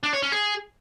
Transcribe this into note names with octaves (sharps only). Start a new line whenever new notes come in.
D4
C#5
C#4
G#4